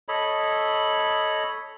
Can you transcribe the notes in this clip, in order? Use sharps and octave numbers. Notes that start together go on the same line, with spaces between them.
A4 C#5 D#5 B5